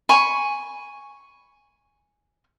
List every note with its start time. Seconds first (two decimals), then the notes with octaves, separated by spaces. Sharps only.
0.09 G#5 B5 C#6